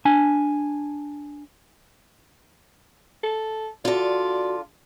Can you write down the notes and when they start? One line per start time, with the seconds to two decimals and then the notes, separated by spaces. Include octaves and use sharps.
0.05 D4 G#5
3.23 A4
3.85 D3 F4 F#4 D5